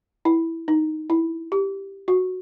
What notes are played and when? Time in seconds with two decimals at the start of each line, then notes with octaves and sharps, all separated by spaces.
0.25 E4
0.68 D#4
1.10 E4
1.52 G4
2.08 F#4